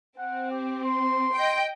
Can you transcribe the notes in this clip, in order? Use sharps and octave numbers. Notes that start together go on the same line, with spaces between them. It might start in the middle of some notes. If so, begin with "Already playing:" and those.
C4 F#5
G4
C6
D#5 G5